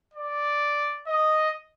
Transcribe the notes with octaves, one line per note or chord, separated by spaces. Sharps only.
D5
D#5